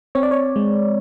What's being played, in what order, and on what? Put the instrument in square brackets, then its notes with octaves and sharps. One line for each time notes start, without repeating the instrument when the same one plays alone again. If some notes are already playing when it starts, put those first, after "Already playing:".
[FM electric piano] C4 C#5
D5
C#5
G#3